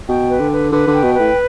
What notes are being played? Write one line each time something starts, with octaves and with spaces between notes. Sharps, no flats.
B2 G5
B4
D3
B4
D3 B4
D3
G5
B2
B4
A2